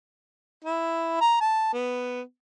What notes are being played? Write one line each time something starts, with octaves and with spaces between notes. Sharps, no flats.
E4
A#5
A5
B3